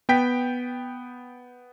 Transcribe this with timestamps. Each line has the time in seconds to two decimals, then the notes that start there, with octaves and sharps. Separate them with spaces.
0.09 B3 G5 B6